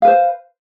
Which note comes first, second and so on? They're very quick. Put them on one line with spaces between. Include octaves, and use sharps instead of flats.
F5 B4 C5